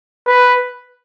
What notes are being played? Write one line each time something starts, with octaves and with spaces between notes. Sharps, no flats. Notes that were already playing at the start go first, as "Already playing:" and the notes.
B4